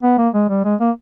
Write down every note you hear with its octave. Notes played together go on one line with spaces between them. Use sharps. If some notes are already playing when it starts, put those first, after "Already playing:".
B3
A#3
G#3
G3
G#3
A#3